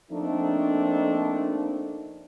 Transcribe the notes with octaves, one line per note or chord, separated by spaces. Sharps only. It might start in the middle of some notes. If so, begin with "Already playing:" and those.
F3 A3 A#3 C4 D4 D#4